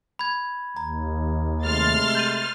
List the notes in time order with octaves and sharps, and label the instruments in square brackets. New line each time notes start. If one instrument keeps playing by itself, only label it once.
[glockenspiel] B5 G#6
[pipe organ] D#2 [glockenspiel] A#5
[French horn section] C3 G#3 A3 [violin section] C6 F6 A6
[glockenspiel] G6 D#7